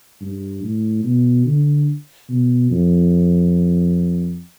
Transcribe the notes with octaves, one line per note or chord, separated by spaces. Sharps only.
G2
A2
B2
D3
B2
F2